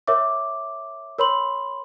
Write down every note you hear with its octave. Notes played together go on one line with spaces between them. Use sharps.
A#4 C#5 E5 D6
A#4 C#5 B5 C6 F#7